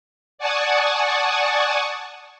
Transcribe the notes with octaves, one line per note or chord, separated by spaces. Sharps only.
D5 F#5 G#5 A5 C#6 D#6